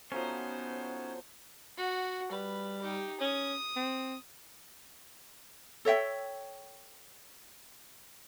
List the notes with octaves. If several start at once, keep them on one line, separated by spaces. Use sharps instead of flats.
F3 F#3 A3 B3 C#4 D#4 C5
F#4 F#5
G3 B4
D#4 G4
C#4 D#6
C4
A4 C#5 E5 G5